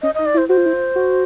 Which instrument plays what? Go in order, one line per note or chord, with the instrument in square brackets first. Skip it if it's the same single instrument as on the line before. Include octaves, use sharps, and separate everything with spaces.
[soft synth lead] C#4 [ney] D#5
[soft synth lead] D#4 [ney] D#5
[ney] D5
[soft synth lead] E4
[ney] C5
[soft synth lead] F#4 [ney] C5
[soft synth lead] F4
E4
F4
F#4